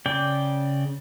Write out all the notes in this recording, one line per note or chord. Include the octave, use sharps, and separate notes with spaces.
C#3 D5 G5